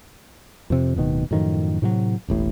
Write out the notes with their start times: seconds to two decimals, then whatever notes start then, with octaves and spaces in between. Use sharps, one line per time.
0.70 F2 C3
0.96 D1 B2 D#3
1.31 F#2 A2 D#3 F3
1.82 A2 C3 D#3 F#3
2.28 E1 A1 A2